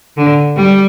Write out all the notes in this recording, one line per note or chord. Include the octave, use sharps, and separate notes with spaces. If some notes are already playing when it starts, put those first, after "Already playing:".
D3
G3